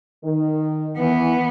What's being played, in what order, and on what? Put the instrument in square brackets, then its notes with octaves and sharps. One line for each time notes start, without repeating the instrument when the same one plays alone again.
[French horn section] D#3
[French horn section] E3 [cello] B3